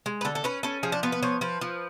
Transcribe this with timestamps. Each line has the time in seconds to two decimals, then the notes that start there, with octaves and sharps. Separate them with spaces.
0.06 G#3
0.21 B4
0.25 D3 A4
0.35 A4
0.44 C#4 B4
0.63 C#4 A4
0.83 F3 G#4
0.92 D4
1.03 B3 F4
1.12 B4
1.23 F3 C#5
1.41 F3 B4
1.61 F3